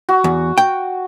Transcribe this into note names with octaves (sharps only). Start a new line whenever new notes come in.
F#4
E2
G5